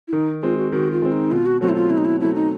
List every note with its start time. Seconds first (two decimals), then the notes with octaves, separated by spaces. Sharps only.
0.08 E4
0.13 D#3 D#4
0.43 G#3 C4 F4
0.57 F#4
0.72 D#3 F#4
0.92 F4
1.02 G#3 C4
1.12 D#4
1.32 B2 F4
1.46 F#4
1.61 F#3 A3 C4 F#4
1.69 E4
1.75 F4
1.90 B2 E4
1.98 D#4
2.05 E4
2.19 F#3 A3 C4 E4
2.35 D#4